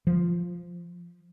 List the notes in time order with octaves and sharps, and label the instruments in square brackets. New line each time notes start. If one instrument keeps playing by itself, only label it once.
[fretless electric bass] F3